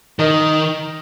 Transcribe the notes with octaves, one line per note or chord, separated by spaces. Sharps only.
D#3 A#4 D#5